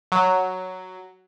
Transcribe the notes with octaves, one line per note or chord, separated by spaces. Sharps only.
F#3